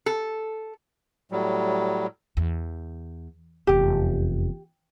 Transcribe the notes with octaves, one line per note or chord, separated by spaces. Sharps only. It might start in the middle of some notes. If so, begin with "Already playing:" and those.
A4
A2 F#3 G3
E2
F1 E2 G4